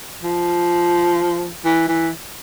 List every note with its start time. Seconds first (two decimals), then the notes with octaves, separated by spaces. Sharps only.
0.23 F3
1.65 E3
1.88 E3